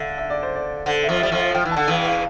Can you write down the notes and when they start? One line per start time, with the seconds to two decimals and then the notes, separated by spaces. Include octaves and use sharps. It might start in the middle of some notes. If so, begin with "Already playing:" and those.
Already playing: D3 E5 F5
0.18 E5
0.30 D5
0.43 C5
0.55 D5
0.86 D3 C5
1.03 E5
1.09 F2 F3
1.20 G3 E5
1.32 F2 F3
1.38 F5
1.54 F3 G5
1.65 E3
1.71 A5
1.76 D3
1.88 E2 E3 F5
2.05 F5